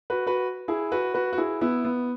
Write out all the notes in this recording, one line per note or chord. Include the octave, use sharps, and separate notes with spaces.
F#4 B4
F#4 B4
E4 G#4
F#4 B4
F#4 B4
F#4
E4 G#4
B3 E4
B3